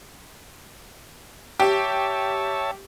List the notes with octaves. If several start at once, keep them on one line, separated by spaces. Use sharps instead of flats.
G4 C#5 E5 A5